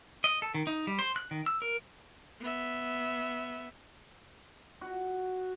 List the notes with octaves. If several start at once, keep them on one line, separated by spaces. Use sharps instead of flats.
D#5
A4
D#3
D#4
G3
C5
F#6
D#3
E6
A#4
B3 E5
F#4